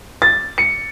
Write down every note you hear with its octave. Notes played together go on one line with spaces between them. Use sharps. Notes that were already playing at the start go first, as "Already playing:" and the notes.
A6
C#7